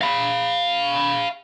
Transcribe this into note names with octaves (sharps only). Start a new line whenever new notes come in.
F5 B5